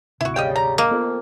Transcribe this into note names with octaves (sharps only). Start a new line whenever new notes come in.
G#1 D2 C3 E4 F#4
C#3 G3 D#5 F5 G5
A#5
A#3 D#5
F2 B3